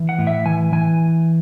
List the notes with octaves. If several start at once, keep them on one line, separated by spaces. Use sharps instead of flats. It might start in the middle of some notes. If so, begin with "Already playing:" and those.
Already playing: E3
F#5
A2
E5
E3 G#5
E3 G#5